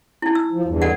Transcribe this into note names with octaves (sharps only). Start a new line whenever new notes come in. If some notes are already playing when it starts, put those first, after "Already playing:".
D#4 E4
E6
F3
E2 G2
A4 D5 F#5